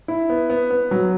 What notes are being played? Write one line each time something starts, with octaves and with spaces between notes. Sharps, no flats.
E4
B3
B3
B3
F#3